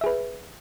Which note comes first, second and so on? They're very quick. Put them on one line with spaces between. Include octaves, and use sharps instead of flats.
E5 G#4 B4